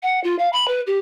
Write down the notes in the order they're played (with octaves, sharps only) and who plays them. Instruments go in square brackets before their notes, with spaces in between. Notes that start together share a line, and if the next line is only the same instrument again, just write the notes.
[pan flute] F#5
F4
F5
B5
B4
G4